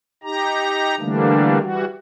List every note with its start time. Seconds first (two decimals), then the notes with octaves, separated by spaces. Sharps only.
0.23 D#4 G4 A#5
1.00 D3 E3 G3 A3 A#3 D4
1.60 E3 G3 F#4